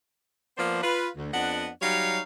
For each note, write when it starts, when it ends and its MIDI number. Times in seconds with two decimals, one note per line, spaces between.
0.57 0.78 53
0.57 0.78 58
0.57 0.78 59
0.57 0.78 72
0.57 0.78 74
0.82 1.08 65
0.82 1.08 71
1.16 1.31 38
1.33 1.68 41
1.33 1.68 59
1.33 1.68 62
1.33 1.68 75
1.33 1.68 78
1.82 2.21 54
1.82 2.21 55
1.82 2.21 63
1.82 2.21 73
1.82 2.21 77